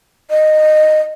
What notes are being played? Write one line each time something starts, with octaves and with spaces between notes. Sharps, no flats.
D#5